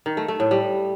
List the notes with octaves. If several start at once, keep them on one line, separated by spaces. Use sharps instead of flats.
D#3
A3
A3
A2
G3